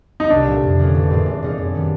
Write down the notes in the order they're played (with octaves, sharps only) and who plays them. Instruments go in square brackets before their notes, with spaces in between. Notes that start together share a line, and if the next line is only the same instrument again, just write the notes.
[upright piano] D#4
[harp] C2 [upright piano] D4
[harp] A#2 F3 A3
F2
D3 F3 A#3 C#4
A1
G#2 E3 A3 C4
G#1
G#2 F3 A#3 D#4
F#2
D#3 G3 B3